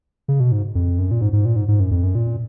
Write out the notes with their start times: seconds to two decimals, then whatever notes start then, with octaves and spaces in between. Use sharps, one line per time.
0.28 C#3
0.40 B2
0.52 G#2
0.75 F2
0.99 F#2
1.11 A#2
1.21 G#2
1.33 G#2
1.45 A#2
1.56 G#2
1.68 G#2
1.80 F#2
1.91 F2
2.03 F#2
2.15 A#2